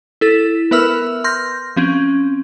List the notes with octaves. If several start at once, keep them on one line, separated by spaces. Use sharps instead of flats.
E4 A4 B6
B3 A#4 B4 E5 E6 F6
C6 F6 G6 A#6
F3 C4 C#4